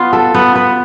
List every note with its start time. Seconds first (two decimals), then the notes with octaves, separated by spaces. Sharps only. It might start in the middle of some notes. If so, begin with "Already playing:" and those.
Already playing: B3 F4
0.13 A4
0.34 B3
0.56 B3